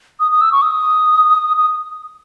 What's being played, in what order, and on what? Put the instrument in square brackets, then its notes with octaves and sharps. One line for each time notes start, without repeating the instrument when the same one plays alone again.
[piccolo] D#6
D#6
E6
C#6
D#6
D#6